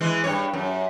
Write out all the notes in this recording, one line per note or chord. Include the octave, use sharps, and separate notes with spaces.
E3 G#3
G2 C#5
F#2